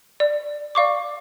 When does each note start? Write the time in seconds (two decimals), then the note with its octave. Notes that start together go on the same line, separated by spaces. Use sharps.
0.20 D5
0.75 D5 F5 C#6 D6